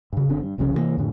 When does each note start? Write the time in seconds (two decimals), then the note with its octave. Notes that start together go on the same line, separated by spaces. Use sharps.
0.13 G2 C#3
0.29 F#1 D3 C4
0.44 G2
0.58 F1 C2 F2 C#3
0.73 C3 E3 F#3 A#3
0.97 F2 A2 D3